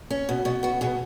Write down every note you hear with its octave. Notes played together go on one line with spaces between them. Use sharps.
C#4
B2
B2 F#4
B3 F#4
B2 G#4